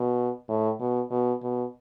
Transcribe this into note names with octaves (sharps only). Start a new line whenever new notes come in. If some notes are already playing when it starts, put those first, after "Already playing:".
Already playing: B2
A2
B2
B2
B2